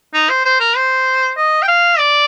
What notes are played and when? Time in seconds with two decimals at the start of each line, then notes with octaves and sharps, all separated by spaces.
0.14 D#4
0.29 C5
0.45 C5
0.60 A#4
0.76 C5
1.37 D#5
1.62 G5
1.68 F5
1.98 D5